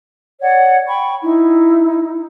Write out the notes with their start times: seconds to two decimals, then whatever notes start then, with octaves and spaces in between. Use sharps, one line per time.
0.41 C#5 D5 F#5
0.88 G5 B5 C#6
1.23 D#4 E4